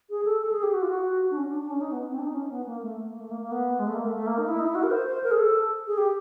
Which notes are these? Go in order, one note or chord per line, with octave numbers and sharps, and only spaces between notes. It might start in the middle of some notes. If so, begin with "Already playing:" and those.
G#4
A4
A4
G#4
G4
F#4
F4
F#4
D4
C#4
D4
D4
C#4
D#4
B3
C4
D4
D#4
C#4
B3
A#3
A3
A#3
A3
A#3
A#3
B3
G#3
A3
A#3
A3
A3
A#3
D#4
E4
D#4
E4
F#4
A#4
C5
C5
A#4
G#4
A4
G#4
G4